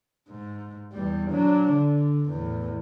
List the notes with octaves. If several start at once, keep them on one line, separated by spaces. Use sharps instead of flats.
G#2
E2 G3
F#3 D4
D3
E2 A2